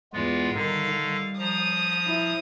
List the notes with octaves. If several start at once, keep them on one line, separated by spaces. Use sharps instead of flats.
E2 G#3 B3 F4
D3 D#3 G3 F5
G3
F3 A#5 D#6
E4